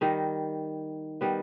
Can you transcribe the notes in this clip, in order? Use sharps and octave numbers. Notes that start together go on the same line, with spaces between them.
D#3 G3 D#4
D#3 G3 B3